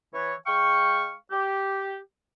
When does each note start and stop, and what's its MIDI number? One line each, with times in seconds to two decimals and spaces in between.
0.13 0.33 52
0.13 0.33 73
0.46 1.13 56
0.46 1.13 77
0.46 1.13 79
0.46 1.13 85
1.31 1.96 67